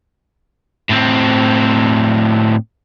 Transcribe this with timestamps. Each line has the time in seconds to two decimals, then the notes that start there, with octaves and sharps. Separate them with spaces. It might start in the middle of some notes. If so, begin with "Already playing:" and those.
0.90 A2 C4